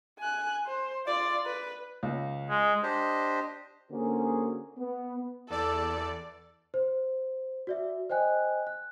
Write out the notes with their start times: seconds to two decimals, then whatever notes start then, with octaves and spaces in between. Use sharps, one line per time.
0.19 G#5 F#6
0.67 C5
1.07 F4 D5
1.46 B4
2.03 C#2
2.50 G#3
2.83 D4 G4 C5 D#5
3.91 D3 A#3 C#4 F#4 G#4 C5
4.78 B3
5.50 E2 A4 D5
6.74 C5
7.67 F#4 D5 E5
8.10 C5 D#5 G5 G#5 F#6
8.67 F#6